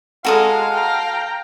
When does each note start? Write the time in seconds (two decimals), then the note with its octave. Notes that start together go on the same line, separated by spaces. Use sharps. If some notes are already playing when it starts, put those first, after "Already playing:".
0.25 G#3 F#4 A4 F5 A#5 D#6
0.73 G5 A#5